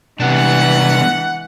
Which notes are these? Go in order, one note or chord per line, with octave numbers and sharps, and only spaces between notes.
C3 E3 G3 G#3 B3 D4 F#5